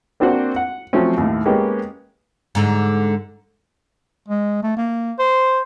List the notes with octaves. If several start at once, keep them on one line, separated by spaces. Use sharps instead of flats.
A#3 C4 D4 F#4 C5 F#5
F#5
F3 F#3 A3 C4 C#4
D#2 A2
G#3 A#3 B3 C#4 G4
G#2 D3
G#3
A3
A#3
C5